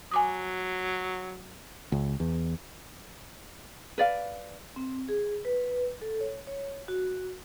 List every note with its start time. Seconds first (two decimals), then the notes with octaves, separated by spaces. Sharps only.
0.11 F#3 G#5 D6 D#6
1.92 C#2
2.20 E2
3.98 B4 D5 F5
4.76 C4
5.09 G#4
5.45 B4
6.01 A4
6.21 C#5
6.47 C#5
6.88 F#4